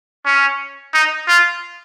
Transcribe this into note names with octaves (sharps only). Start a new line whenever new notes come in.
C#4
D#4
F4